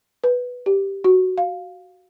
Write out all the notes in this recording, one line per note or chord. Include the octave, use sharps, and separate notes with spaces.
B4
G4
F#4
F5